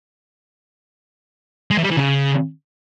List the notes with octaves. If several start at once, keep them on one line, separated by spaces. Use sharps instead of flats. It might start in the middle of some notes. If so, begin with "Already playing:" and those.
G#3
E3
G3
E3
C#3